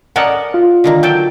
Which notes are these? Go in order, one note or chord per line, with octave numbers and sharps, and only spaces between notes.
C#4 A4 A#4 D5 D#5 F#5
F4
D3 D#3 A#3
F#3 A4 G5